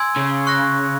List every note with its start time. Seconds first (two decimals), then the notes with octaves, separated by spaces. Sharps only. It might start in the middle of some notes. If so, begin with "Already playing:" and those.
Already playing: G#5 C6 E6 G#6
0.16 C#3
0.47 C#6 F#6 A#6